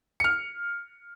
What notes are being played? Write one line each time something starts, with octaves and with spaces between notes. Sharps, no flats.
F6 C#7